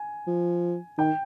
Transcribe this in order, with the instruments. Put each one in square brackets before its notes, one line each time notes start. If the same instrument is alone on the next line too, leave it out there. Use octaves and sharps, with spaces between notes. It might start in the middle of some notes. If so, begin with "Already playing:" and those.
Already playing: [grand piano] G#5
[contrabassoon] F3
[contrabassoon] D#3 [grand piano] G5